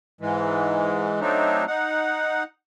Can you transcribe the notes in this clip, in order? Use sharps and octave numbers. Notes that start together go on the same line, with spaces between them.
G#2 E3 G#3
F#3 A3 C4 D4 D#4
D#4 F#5